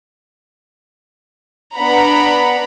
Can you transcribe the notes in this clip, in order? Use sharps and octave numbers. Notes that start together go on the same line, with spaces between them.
B3 D4 F#5 A#5 B5